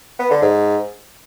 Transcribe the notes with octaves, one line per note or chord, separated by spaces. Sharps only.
B3
D3
G#2